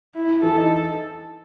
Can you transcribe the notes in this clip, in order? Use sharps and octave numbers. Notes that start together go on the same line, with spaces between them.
E4
E3 A4
D#4